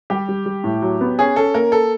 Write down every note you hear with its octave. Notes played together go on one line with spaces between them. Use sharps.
G3 G4
G3
G3
A2
F#3
B3
C#4 G#4
C#4 A4
A#3 A#4
A4